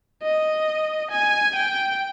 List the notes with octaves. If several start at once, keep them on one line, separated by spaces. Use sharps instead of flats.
D#5
G#5
G5